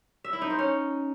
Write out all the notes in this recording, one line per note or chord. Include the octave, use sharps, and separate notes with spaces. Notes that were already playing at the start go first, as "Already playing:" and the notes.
E5
E4
D#4
C5
C#4